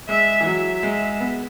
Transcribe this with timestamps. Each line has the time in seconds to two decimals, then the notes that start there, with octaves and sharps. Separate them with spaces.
0.09 G#3 E5
0.41 E3
0.46 F#3 E5
0.83 G#3
1.20 B3